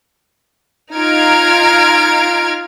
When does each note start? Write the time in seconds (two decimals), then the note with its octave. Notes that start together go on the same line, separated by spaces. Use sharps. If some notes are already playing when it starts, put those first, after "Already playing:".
0.94 D#4 F4 A#5 F6 G#6 D7